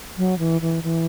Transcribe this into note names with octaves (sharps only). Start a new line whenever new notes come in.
F#3
E3
E3
E3